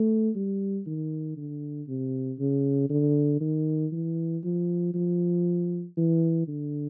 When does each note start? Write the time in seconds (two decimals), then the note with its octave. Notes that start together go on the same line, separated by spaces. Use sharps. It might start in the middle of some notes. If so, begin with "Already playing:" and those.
Already playing: A3
0.35 G3
0.86 D#3
1.37 D3
1.88 C3
2.39 C#3
2.90 D3
3.41 D#3
3.92 E3
4.44 F3
4.94 F3
5.97 E3
6.48 D3